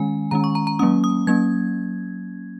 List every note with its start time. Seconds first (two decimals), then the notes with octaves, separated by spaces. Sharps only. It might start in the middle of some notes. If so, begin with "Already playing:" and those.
Already playing: D#3 G#3 C#4 G#5
0.31 D#3 G#3 C#4 A#5
0.44 C#6
0.55 A#5
0.67 A#5
0.79 F#3 A#3 C#4 D#6
1.04 D#6
1.27 F#3 A#3 C#4 G#6